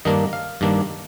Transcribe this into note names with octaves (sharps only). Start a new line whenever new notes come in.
G2 D#3 A#3 D4 D#5
F5
G2 D#3 A#3 D4